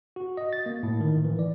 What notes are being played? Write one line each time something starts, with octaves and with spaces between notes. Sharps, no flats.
F#4
D#5
A6
A#3
A2
D#3
E3
D5